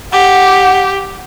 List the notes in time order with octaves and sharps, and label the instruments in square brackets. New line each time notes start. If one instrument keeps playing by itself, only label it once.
[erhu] G4 [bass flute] F#5